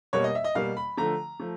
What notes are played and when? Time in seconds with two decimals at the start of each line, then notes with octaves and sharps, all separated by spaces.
0.13 B2 G3 A#3 C#5
0.24 D#5
0.35 E5
0.44 D#5
0.55 B2 G3 A#3 F5
0.77 B5
0.97 D3 F3 A3 A#5
1.40 F3 A3